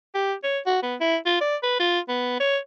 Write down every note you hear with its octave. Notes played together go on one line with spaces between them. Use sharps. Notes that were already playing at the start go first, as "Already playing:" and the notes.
G4
C#5
F#4
B3
E4
F4
D5
B4
F4
B3
C#5